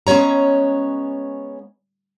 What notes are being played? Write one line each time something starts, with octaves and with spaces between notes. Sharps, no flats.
G#3 B3 C#4 C#5 A#5